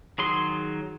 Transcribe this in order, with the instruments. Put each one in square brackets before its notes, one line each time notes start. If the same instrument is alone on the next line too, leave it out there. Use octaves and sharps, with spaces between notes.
[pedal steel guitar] D#3 F#3 G#4 C6